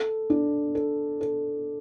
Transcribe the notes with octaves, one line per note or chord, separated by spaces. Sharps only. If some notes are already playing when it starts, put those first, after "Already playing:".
Already playing: A4
D4
A4
A4